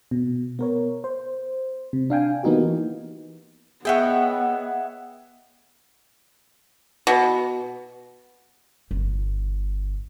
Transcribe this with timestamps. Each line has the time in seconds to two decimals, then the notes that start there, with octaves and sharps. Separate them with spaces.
0.11 B2
0.59 B3 A#4 C#5
1.04 C5
1.93 C3
2.10 D4 F5 G5 G#5
2.43 E3 A#3 B3 D#4 F#4 G4
3.85 B3 G#4 C#5 D#5 E5 F#5 G5
7.07 B2
8.91 G1